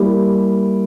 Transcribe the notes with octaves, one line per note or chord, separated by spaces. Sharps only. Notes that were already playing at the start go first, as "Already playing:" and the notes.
Already playing: G3 A#3 E4 G4